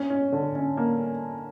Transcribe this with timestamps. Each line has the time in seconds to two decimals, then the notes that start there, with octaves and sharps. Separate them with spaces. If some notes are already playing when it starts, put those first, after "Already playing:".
Already playing: C#4
0.10 C#4
0.32 D3
0.55 C#4
0.77 A#3